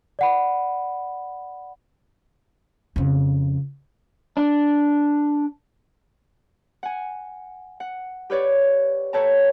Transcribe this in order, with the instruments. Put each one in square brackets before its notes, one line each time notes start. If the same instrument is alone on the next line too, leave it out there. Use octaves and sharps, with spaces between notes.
[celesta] D5 F#5 B5
[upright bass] F2 C#3
[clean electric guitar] D4
[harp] F#5 G#5
F#5
G4 B4 C#5 D5
A4 B4 C#5 G5 A5 A#5